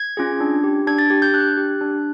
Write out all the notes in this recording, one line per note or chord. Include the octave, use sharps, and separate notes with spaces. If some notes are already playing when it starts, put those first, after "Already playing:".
Already playing: G#6
C#4 F4 G#4
D4
G4
D4 G#6
A6
G4 G#6
G6
D4 F#6
G4
D4